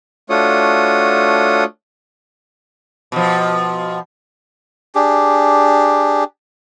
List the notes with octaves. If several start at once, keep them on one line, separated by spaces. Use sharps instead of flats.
A3 D4 F4 F#4 C#5 D#6
B2 F3
D4 G4 G#4